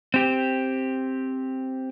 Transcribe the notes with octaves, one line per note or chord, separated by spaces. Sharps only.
C4 G4